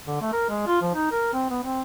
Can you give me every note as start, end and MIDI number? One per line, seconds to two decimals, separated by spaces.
0.07 0.17 50
0.21 0.30 57
0.33 0.47 70
0.49 0.66 56
0.67 0.81 65
0.82 0.90 53
0.94 1.10 63
1.12 1.30 70
1.33 1.50 60
1.50 1.62 59
1.63 1.82 60